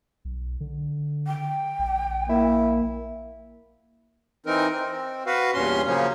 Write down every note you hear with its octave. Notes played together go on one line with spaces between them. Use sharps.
B1
D3
G5
A#1
A#3 E4
E3 C4 D#4 A#4
C4
F#4 B4 F5
E2 G2 A#2 C#4 C6
C#3 F3 F#3 A#3 C#4